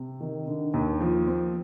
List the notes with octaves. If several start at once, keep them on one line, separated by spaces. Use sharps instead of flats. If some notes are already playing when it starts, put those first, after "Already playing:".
Already playing: C3
D#3
D3
D#2
F3
C4